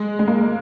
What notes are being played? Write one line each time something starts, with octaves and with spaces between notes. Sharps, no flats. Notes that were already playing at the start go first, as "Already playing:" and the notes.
Already playing: G#3
G#3
A#3